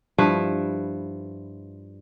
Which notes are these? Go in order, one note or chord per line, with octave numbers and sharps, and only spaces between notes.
G2 F3 E4 B4